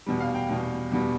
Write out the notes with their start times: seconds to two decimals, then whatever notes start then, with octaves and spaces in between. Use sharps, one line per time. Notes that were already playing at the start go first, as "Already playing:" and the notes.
0.06 E2 B2 G3
0.20 F5
0.35 G5
0.49 E2 B2 G3
0.92 E2 B2 G3